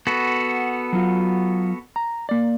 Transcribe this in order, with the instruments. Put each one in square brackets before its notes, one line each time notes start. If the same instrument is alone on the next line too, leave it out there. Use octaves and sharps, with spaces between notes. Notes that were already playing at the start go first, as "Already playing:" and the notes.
[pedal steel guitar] B3 F#4 A4
[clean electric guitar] F#3 F4
A#5
A#3 D5